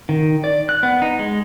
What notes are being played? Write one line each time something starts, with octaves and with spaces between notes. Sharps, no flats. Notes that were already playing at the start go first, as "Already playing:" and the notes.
D#3
D5
F#6
B3
D#4
G#3